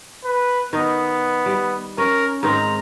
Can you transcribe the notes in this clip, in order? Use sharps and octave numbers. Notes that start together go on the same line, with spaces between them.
B4
D#3 B3 D#4
G3
C#4 A#4
G#2 D#3 C4 A#5